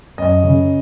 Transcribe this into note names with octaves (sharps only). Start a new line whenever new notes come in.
F#2 D#5
C#3